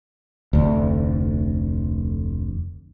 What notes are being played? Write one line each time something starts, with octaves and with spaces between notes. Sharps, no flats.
F1 D2